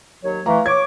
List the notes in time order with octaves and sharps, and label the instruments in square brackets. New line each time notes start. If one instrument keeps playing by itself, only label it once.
[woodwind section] D#2 F#3 C#5
[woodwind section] E3 A3 [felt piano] F5 A#5
[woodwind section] C#5 D6 [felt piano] G#6